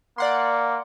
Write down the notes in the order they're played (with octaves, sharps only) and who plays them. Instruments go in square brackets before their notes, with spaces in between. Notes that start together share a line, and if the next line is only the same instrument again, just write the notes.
[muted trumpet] A#3 [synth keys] D5 F#5 C6